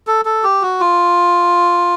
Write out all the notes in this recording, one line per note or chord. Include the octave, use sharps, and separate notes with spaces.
A4
A4
G4
F#4
F4